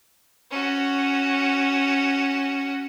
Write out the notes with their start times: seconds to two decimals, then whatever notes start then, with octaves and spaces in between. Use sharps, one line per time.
0.51 C#4 F#4